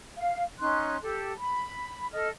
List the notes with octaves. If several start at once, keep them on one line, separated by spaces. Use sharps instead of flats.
F5
C#4 D#4 C6 F#6
G4 A4
B5
A4 D#5 F6